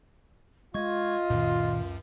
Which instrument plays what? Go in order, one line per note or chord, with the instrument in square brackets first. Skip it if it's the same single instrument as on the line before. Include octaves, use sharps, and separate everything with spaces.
[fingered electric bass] G#3 [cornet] F4 [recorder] D#5 [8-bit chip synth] C#6 G#6
[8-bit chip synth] C#2 F#2 [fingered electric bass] A#2 D#3